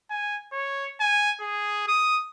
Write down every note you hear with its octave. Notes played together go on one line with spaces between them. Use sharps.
G#5
C#5
G#5
G#4
D#6